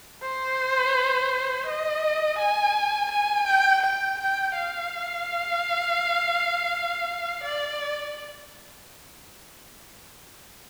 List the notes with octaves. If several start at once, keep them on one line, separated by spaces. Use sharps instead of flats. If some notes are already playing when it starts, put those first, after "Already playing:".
C5
D#5
G#5
G#5
G5
G5
G5
F5
D5